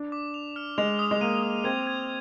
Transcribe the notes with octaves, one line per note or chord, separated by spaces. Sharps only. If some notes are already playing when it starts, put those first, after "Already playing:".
Already playing: D4
D6
F7
F6
G#3 F7
D#6
G#3
A#3 D#7
D#6
C4 G#6
G#6